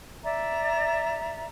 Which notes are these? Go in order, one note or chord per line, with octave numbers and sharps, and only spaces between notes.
D5 E5 A#5